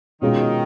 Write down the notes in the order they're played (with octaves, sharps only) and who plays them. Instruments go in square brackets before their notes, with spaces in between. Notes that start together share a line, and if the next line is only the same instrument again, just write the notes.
[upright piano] B2 G#3 C#4 F4 [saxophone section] D#3